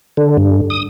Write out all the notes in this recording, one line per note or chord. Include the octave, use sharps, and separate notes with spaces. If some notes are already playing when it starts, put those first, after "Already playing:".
D3
G2
D#6